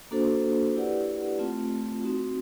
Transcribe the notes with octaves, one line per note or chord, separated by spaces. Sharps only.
A#3 D4 F#4 A4 C5
E4 G4 B4 D5 F#5
A3 C4 F4
C4 D#4 F#4